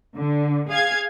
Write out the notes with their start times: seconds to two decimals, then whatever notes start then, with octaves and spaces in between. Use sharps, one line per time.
0.16 D3
0.70 G#4 F5 G#6